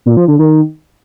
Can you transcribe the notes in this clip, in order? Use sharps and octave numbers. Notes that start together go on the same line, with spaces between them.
A#2
F3
D3
D#3